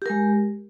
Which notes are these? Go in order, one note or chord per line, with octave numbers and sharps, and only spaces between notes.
G#3 G4 A#4